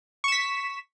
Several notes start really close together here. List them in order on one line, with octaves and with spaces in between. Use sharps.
C#6 E7 B6